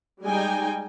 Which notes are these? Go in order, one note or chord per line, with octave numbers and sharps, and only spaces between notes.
G3 G#3 D#4 G5 G#5